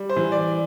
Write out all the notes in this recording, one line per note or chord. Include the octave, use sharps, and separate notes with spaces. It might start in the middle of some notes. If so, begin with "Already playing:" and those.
Already playing: G3
C5
E3
D5